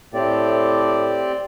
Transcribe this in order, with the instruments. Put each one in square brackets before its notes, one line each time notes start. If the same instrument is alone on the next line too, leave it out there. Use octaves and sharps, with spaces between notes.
[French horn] A2 [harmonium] C4 G4 D5